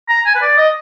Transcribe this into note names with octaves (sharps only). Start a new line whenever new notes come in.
A#5
G#5
B4
D5
D#5